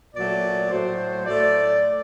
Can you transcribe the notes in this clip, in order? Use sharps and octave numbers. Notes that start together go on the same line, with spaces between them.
A#2 F#3 A3 D5
A2 F#3 A3 C5
A2 A3 D5